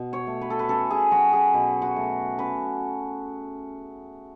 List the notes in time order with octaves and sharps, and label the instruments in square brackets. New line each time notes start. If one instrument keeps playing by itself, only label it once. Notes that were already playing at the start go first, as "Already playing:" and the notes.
Already playing: [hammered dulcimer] B2
C#5
A3
B4
A4
B4
C#4 A4
G#4
F#3 F#4
G#4
B2 B4
F#4
A3
C#4 B4